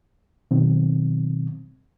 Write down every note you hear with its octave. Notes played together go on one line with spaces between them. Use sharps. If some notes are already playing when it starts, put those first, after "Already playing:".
B2 D#3 F#3 C4